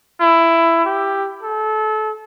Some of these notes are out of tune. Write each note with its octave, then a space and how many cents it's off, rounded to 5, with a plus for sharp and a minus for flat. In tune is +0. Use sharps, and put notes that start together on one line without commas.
E4 +15
G4 +5
A4 -30